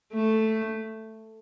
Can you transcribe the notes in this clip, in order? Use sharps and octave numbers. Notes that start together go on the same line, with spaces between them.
A3